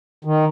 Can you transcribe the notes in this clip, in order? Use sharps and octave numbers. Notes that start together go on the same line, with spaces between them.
D#3